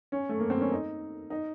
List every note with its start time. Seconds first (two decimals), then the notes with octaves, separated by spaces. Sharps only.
0.12 C#4
0.29 A3
0.40 A#3
0.50 C4
0.61 C#4
0.72 D#4
1.30 D#4